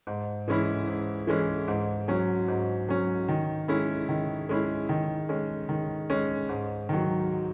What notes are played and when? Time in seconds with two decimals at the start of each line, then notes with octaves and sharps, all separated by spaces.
0.07 G#2
0.48 E3 G#3 C#4 E4
0.87 G#2
1.27 E3 G#3 C#4 E4
1.68 G#2
2.08 F#3 C#4
2.48 G#2
2.89 F#3 C#4
3.28 D#3
3.68 G#3 C#4 E4
4.09 D#3
4.49 G#3 C#4 E4
4.89 D#3
5.29 G#3 C#4
5.69 D#3
6.10 G#3 C#4
6.49 G#2
6.89 D#3 F#3